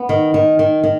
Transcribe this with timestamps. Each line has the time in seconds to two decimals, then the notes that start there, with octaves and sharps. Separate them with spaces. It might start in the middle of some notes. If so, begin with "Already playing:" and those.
Already playing: B3
0.09 D#3
0.34 D#3
0.59 D#3
0.84 D#3